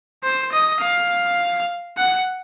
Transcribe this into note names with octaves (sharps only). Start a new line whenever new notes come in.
C5
D#5
F5
F#5